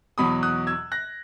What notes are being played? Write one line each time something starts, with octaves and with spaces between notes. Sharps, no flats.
E2 B2 F#3 B5 D#6
D#6 F#6
E6 G#6
F#6 A#6